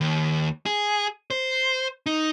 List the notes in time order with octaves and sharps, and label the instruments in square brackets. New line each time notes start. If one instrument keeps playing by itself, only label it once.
[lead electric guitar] D#2
G#4
C5
D#4